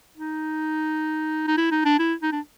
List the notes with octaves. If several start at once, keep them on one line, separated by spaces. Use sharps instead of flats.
D#4
D#4
E4
D#4
D4
E4
D#4
D4